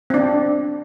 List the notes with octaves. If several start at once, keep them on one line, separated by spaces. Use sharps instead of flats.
C4 D4